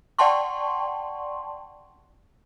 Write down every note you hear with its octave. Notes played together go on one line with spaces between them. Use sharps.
D5 F#5 G5 A5 C6 C#6